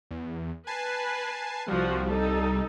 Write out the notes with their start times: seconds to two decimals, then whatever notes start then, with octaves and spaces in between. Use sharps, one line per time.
0.11 E2
0.67 B4 G#5 A5 C7
1.68 C2 F3 G3 F#4
2.09 D#4 A4